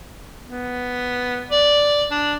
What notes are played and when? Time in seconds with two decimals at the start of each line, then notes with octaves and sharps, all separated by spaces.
0.45 B3
1.50 D5
2.11 D4